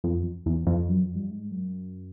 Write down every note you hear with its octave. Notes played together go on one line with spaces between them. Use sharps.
F2
E2
F2
F#2
F2
G2
G#2
F#2